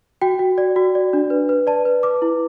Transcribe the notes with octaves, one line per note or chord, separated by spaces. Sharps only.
F#4 G5
F#4
D5
F#4
D5
D4
B4
B4
D5 A5
B4
B4 D6
E4